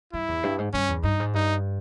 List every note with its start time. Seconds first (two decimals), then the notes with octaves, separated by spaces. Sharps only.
0.13 G2 E4
0.28 E2
0.43 G2
0.58 G#2
0.74 G2 C#4
0.89 E2
1.03 G2 D#4
1.20 G#2
1.34 G2 D#4